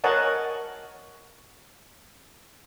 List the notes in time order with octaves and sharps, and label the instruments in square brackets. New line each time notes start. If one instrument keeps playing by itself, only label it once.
[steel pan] A#4 C#5 D#5 F#5 G#5 A5